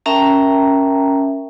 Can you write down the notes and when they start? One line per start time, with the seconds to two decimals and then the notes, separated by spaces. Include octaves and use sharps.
0.06 C#4 A#4 E5 G5 A5 A#5